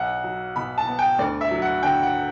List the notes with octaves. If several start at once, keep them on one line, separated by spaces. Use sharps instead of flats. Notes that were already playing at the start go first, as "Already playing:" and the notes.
Already playing: B1 F#5
F#3
B2 B5
A5
B3
G5
D2 D5
E5
F#3
F#5
D3 G5
F#5